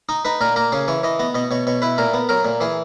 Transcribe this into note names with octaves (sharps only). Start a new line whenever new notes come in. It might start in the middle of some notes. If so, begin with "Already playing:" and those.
D#4 D#5
D#4 B4
A#2 A#4
A#3 A#4
C#3 G#4
E3 C#5
E3 D#5
B3 D#5
B2 D#5
B2 C#5
B2 C#5
E4 B4
A#2 A#4
B3
F#3 A#4
A#2
E3 G#4